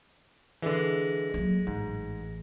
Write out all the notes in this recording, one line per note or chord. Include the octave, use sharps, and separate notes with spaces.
D3 E3 G#3
F#3 A#3
A1 G#2